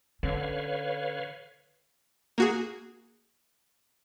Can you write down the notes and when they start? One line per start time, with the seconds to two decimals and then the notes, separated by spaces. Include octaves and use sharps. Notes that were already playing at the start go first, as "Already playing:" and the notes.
0.23 D3 C#4 B4 C#5 F5
2.38 A#3 F#4 G#4